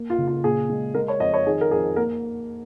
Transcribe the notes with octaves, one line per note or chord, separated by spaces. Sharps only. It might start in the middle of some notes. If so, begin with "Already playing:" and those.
Already playing: A#3
F4
C#3
F4
A#2 G#4
G#3
G#3 A#4
C#5
F2 D#5
C#5
D#3 G#4
A#4
F2 G#4
A#3 A#4